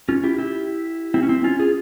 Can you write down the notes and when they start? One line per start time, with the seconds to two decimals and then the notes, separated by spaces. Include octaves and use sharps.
0.09 C#4 F4
0.24 E4 G4
0.38 E4 G4
1.14 C4 E4
1.22 C#4
1.29 C4 E4
1.44 C#4 F4
1.59 F4 G#4